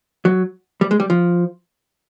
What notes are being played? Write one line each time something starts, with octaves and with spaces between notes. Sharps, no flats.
F#3
G3
G#3
G3
F3